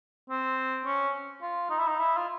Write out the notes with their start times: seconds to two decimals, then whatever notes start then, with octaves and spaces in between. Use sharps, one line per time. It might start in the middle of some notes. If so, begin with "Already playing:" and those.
0.30 C4
0.86 C#4
1.42 F4
1.70 D#4
1.79 E4
1.87 D#4
1.99 E4
2.17 F4